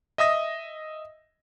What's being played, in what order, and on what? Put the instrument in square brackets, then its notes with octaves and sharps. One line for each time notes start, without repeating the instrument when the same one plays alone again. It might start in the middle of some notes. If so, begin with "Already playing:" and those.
[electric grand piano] D#5 E5 D#6 A#6